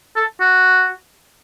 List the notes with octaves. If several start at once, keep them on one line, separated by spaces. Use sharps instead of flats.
A4
F#4